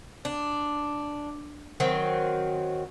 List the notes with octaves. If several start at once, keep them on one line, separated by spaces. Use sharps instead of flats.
D4
D#3 F#3 C4